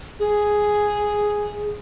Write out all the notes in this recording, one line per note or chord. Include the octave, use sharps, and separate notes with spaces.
G#4